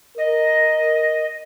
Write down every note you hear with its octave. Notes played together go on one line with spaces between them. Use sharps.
A#4 D#5